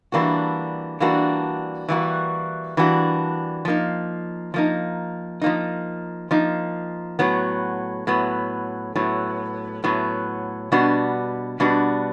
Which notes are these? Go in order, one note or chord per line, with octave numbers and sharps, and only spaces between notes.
E3 G3 A#3 D4 F#4
E3 G3 A#3 D4 F#4
E3 G3 A#3 D4 F#4
E3 G3 A#3 D4 F#4
F3 A#3 D#4
F3 A#3 D#4
F3 A#3 D#4
F3 A#3 D#4
A2 F#3 B3
A2 F#3 B3
A2 F#3 B3
A2 F#3 B3
B2 G3 B3 D4 F#4
B2 G3 B3 D4 F#4